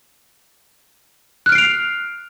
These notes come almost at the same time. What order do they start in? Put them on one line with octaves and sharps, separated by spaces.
F#6 F6 D7 C7 F7